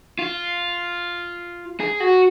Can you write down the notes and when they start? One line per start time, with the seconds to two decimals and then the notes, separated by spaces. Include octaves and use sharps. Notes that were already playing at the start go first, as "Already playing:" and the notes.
0.19 F4
1.80 G#4
2.00 F#4